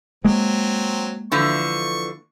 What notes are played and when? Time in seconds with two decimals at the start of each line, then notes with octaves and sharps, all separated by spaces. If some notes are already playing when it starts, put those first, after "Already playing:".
0.25 F#3 G#3 A#3 C4
1.32 D3 E3 F3 C#6